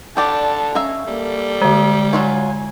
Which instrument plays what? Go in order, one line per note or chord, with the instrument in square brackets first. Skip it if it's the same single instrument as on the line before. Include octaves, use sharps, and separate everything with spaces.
[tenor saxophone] D3 [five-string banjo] G4 D5 G5 [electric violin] A5
[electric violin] C#4 [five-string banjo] E5 F5 A#5
[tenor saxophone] G3 [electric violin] A#3 A4
[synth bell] D3 G#3
[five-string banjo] F#3 F4 C#5 [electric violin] G#5